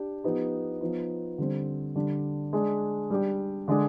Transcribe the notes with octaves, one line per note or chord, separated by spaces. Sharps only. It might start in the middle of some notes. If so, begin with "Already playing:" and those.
Already playing: D4 G4
F3 B3 D#4 G4
F3 B3 D#4
D3 G3 C4
D3 G3 D4
G#3 D4 G#4
G3 D4 G4
D3 G#3 D4 G#4